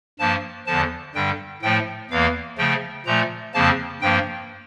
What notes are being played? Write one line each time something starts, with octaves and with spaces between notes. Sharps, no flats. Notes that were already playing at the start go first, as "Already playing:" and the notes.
G2 F3 A#3 A5
E2 D3 F3 A5
G2 D3 G3 G5
A2 F3 A3 G5
E2 E3 A#3 F5
C#3 F3 A3 G5
A#2 F3 A3 A#5
F2 C#3 F3 A#3 A5
G2 F3 A#3 G5